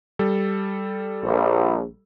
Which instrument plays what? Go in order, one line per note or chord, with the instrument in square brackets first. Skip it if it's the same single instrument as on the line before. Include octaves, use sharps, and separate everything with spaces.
[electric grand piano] G3 A4
[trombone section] A#1